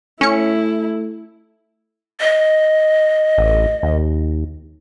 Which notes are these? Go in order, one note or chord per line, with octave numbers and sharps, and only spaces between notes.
A3 C#4 E4 C#7
D#5
A1
D#2